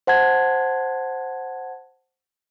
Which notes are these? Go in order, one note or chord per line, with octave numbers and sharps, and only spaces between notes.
C5 F#5 A5 G#6